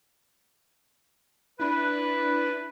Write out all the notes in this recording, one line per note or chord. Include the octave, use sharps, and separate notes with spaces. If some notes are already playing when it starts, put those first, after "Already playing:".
D4 E4 B4